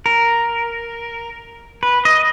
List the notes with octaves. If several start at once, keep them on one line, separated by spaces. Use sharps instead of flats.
A#4
B4
D#5